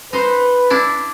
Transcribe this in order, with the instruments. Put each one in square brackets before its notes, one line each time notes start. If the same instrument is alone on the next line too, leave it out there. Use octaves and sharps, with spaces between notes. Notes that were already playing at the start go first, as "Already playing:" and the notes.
[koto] D#4 C5 [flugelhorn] B4
[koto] D4 E4 D5